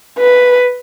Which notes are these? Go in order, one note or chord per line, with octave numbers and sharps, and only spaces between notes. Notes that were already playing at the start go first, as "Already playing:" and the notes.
B4